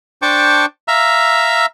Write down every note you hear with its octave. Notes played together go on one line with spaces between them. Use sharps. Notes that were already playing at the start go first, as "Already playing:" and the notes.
D4 C5 G5 A5 C#6 D6
E5 F5 A#5 E6